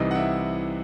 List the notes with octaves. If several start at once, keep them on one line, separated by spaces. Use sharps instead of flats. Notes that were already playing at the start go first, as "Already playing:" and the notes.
Already playing: C2 C3 E3 D#4 D#5
F#5
E4 E5